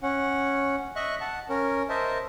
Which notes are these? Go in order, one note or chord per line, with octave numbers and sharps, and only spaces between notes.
C#4 F#5
D#5 E5 C#6 F#6
F#5 A5
C#4 A#4
A#4 C5 D#5 E5 A5